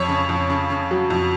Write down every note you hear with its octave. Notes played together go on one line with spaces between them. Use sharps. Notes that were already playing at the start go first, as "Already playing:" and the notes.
Already playing: F2 C#5
C#3
F2
C#3
C#3
F#3
F2